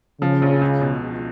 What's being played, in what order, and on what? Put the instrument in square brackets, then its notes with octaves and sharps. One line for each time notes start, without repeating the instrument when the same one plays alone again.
[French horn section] C#3 [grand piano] F3
[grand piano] A#1
C#2
B2